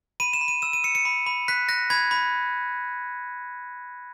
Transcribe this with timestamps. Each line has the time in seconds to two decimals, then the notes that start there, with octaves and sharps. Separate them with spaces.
0.20 B5 D#7
0.33 E7
0.41 B5
0.48 D#7
0.62 E6 E7
0.73 D#7
0.84 E6 C#7
0.95 C#7
1.05 B5
1.27 B5
1.48 F#6 B6
1.69 F#6 A#6
1.90 B5 G#6
2.11 B5